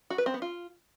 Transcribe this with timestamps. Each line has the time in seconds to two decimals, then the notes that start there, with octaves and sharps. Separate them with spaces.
0.10 F#4
0.18 B4
0.26 C4
0.34 B3
0.42 F4